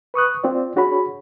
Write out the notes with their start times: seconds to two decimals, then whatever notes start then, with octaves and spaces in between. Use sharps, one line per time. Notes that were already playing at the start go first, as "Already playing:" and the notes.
0.14 B4 C#6 D#6 F#6
0.44 C4 F4 D5
0.76 D4 F#4 G#4 C#5 B5